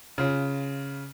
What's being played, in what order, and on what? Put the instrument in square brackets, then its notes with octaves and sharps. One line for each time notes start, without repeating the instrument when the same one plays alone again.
[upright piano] C#3 F4